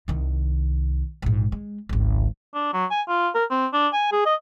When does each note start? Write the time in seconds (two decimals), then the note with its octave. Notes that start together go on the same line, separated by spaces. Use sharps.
0.08 C2 D#3
1.22 A#1 G#2
1.52 G#3
1.89 G#1 C#2
2.55 D4
2.73 F#3
2.91 G#5
3.08 F4
3.35 A#4
3.50 C4
3.73 D4
3.93 G#5
4.12 G#4
4.26 D#5